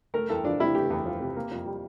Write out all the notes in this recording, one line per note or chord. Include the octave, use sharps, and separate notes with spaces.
A3 A#4
E2 A4
F3 D4
C3 E4
A3 G4
E2
F3
C3
A#3
F2
G3